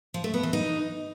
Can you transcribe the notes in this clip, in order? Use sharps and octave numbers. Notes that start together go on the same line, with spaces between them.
F3
A3
B3
E3
D#4